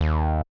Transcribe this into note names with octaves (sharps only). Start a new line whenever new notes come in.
D#2